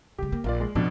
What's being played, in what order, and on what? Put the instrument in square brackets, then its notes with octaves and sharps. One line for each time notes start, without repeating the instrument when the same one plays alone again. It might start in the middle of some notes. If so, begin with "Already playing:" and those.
[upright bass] C#3 G#3 [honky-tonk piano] G4
[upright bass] A#3
[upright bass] A#1 [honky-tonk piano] A#3 F4 D5
[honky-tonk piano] G#3
[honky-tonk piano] F2 B2 D4 [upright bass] F3